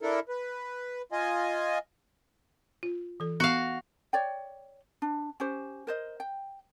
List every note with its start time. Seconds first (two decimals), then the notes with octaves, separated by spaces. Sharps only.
0.01 D4 E4 A4 A#4
0.29 B4
1.12 F4 D#5 G#5
2.83 F4
3.20 E3 A4
3.40 B3 F#4 F5
4.13 C#5 D5 G5
5.02 D4
5.40 C#4 G4 C5
5.87 A#4 C5 D#5
6.20 G5